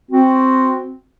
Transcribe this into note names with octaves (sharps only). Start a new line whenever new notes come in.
C4 F#4